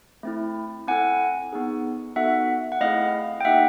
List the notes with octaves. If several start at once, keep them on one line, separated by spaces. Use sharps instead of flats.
A3 C4 E4
C4 E4 A4 F#5 G#5
B3 D#4 G#4
B3 D#4 F#4 A4 E5 F#5
F#5
A3 C4 E4 G#4 D#5 F5
G5
A#3 D#4 G4 E5 F#5